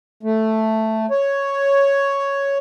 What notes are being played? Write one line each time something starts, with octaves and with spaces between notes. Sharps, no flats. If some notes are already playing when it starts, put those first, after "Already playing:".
A3
C#5